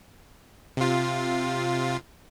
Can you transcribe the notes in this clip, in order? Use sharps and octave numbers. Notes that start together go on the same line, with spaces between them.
C3 F4